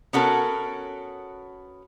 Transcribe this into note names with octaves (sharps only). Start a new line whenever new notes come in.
B3 C#4 F#4 A4 A#4